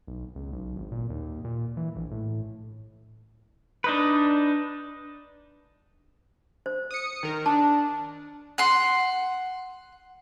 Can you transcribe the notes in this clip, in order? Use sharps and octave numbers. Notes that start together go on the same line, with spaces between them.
B1
C#2
B1
G#1
A#2
D#2
A#2
E3
A#1
A2
D4 D#4 B4
C5
D#6 C#7
D#3 A#4
D4 A5
F#5 C6